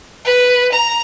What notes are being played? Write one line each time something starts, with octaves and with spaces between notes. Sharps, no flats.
B4
A#5